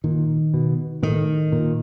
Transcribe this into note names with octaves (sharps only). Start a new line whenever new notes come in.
A#2 D#3
B2
A2 D#3
A#2